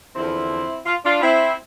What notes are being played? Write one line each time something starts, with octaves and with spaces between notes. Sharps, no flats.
E2 D3 F3 C4 E4
F4
D4 F4
C4 E4